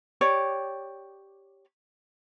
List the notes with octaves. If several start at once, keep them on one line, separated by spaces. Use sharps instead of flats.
G4 C#5 D5